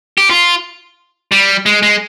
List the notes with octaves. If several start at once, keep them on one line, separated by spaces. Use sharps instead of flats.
G4
F4
G3
G#3
G#3